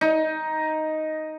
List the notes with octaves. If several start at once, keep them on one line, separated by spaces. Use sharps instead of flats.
D#4